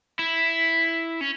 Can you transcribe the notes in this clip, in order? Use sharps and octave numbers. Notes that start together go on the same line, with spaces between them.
E4
C#4